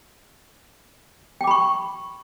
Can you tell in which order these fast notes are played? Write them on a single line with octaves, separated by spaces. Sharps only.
G5 D6 B5 C#6